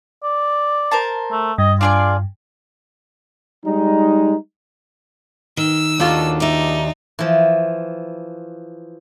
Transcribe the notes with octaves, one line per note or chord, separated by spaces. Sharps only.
D5
A#4 C5 A5
A3
G2 D#5
D4 F4 G#4 D5
G3 G#3 D#4
D#3 E6
D#2 D4 F4 F#4 A4
D#4 D5 E5
E3 F3